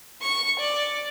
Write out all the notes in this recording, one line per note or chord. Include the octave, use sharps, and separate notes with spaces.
C#6
D5